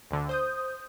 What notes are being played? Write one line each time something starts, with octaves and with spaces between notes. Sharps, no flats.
D2 D3
C5 D#6 G6